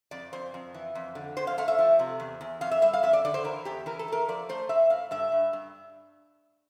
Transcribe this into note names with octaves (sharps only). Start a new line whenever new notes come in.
F2 D5
F2 C5
F2
E3
F2
D3
F2 C5
F5
A3 F5
E5
F3
C3
E2
E2
F2 F5
E5
G3 E5
F5
F2 E5
D5
D3 D5
C5
E3 A#4
E2 G4
E3 A#4
A4
A3 A#4
F3 D5
A3 C5
A2 E5
A2 F5
G2 E5
G2
G2